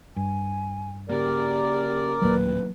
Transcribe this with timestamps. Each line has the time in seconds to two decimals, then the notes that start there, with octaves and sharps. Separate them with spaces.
0.16 G2 G#5
1.09 C#3 A#3 G4 A#4 D5
2.22 A1 D#2 A#2 F#3 A#3 B4